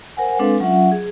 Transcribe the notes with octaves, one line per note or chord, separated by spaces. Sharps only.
A#4 C5 F#5 G#5
G#3 C4 D4 A4 B4 F5
F#3 C#4 F4 E5 F#5
G#4